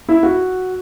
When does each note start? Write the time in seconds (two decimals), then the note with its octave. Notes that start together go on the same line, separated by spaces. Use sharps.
0.09 E4
0.23 F#4